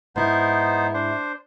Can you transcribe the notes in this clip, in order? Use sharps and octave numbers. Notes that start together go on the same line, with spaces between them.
G#2 B3 D#4 E4 C5
D4 C5